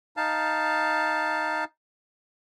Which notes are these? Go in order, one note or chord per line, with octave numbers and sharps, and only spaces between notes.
D#4 F5 A5